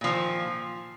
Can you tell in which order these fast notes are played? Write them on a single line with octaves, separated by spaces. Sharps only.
A#2 F3 D#3